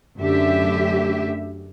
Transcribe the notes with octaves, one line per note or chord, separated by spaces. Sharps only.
F#2 D3 A3 G4 E5